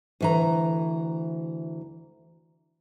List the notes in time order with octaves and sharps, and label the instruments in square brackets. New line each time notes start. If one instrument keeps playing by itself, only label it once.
[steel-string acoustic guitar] D2 E3 A#5